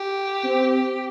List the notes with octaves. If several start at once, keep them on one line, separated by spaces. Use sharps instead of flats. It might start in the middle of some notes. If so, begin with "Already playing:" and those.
Already playing: G4
C4